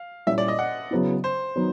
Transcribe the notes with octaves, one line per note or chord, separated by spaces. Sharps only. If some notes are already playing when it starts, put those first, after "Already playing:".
Already playing: F5
A#2 G3 A#3 C#4 E4 E5
D5
D#5
F#5
C#3 F#3 B3 E4
C5
D#3 F#3 B3 D#4